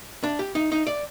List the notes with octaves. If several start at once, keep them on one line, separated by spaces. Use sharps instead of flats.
D4
G4
D#4
D#4
D5